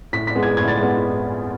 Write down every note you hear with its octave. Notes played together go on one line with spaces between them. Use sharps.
A2 B6
B6
G#3 B3
G#6
A2 G#6
A6
G#3 B3